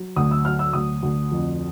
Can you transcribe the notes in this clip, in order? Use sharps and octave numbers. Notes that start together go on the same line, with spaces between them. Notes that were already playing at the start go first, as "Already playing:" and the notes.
Already playing: F#3
D2 D#6
E6
F#3 F6
E6
D2 D#6
D2
F2